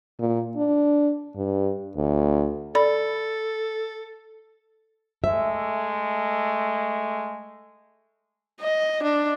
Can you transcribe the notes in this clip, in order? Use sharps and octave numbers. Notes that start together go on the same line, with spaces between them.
A#2
D4
G2
D2
A4 D5 B5
G#3 A3 E5
D#5
D4